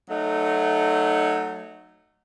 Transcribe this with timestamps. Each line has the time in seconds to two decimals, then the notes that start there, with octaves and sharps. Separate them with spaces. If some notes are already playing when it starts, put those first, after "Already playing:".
0.10 F#3 A3 D#4